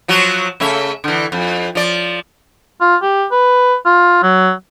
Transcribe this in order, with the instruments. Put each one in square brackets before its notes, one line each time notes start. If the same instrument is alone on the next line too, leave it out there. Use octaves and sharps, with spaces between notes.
[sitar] F3 F#3 F#4
C#3 A3 E5
D3 E3
F2
F3 D5
[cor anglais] F4
G4
B4
F4
F#3